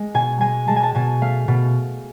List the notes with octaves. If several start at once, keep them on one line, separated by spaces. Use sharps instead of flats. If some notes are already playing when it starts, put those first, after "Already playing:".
Already playing: G#3
B2 G#5
G#3 G#5
G#3 A5
G#5
A5
B2 G#5
A3 F5
B2